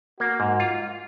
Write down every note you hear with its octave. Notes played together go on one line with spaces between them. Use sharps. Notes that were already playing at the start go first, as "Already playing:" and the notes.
A#3 F#4
G#2
F4